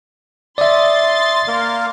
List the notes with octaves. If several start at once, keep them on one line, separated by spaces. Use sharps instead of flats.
D5 E5 C6 D#6 A6
A#3 A#4 F5